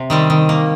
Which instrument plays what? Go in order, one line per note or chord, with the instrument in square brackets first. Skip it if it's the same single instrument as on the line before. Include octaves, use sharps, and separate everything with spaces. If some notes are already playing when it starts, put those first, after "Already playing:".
Already playing: [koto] C3
D#3 G3 C4
D#3
A#3